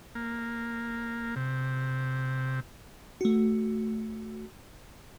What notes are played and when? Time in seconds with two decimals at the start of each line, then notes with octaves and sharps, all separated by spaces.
0.15 A#3
1.36 C3
3.21 A3 F#4